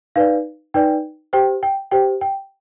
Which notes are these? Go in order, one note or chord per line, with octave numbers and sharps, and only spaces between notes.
D#4 B4 D5 F5
D#4 B4 D5 G5
G4 C5 G5
G5
G4 C5 G5
G5